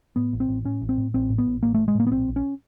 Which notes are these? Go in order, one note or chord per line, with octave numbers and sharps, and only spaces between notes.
A2 B3
A1
C4
A1
A2 C#4
A1
C4
A2
A1 C4
A2
B3
A1
A1 A#3
A3
A2
G#3
A2 A#3
B3
A#1 C4
A#1
C#4